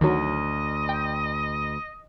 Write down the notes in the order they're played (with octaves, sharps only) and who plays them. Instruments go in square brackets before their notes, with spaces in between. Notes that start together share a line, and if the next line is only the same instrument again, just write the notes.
[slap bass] D2 [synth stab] D#3 F#3 [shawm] D#5
[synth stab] G5